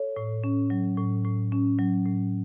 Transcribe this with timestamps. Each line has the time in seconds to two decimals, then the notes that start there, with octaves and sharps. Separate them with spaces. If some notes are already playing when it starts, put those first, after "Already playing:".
Already playing: A4 C#5
0.16 A2
0.44 C#4
0.70 F#3
0.98 A2
1.24 A2
1.52 C#4
1.79 F#3
2.06 A2